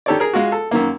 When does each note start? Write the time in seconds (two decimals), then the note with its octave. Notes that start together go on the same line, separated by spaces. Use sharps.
0.06 D#3 G4 A4 C#5 D5
0.20 G#4 A#4
0.33 G#3 F4 F#4
0.52 A4
0.71 F#2 D#3 A#3